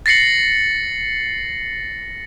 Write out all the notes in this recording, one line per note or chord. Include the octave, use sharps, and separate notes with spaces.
A6 A#6 C7 C#7 F#7